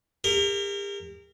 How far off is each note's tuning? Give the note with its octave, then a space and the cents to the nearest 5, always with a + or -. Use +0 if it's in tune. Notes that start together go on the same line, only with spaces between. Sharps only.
G4 +40 A#4 -25